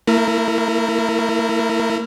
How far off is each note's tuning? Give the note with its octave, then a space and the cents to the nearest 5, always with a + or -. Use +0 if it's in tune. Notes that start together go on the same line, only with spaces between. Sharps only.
A3 +45 E4 +0 A#4 +0